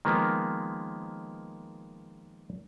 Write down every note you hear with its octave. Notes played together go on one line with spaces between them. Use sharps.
D#3 F3 G#3 A#3 B3